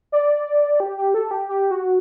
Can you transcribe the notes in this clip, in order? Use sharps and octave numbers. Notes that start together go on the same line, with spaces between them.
D5
G4
G4
A4
G4
G4
F#4